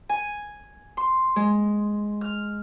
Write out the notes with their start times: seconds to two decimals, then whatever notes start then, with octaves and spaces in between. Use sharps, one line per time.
0.09 G#5
0.97 C6
1.36 G#3
2.21 F6